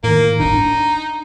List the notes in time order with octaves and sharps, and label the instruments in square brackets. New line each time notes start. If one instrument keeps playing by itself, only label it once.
[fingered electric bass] A2 D#3 [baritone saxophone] A#3
[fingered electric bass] D1 G1 D4 [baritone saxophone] D#4
[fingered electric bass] D4